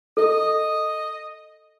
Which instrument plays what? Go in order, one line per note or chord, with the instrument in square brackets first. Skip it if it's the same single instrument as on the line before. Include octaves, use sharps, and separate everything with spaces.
[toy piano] A4 [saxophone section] D#5